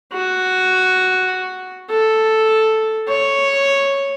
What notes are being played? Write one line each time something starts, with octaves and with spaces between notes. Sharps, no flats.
F#4
A4
C#5